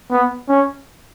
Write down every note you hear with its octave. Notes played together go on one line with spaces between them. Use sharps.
B3
C#4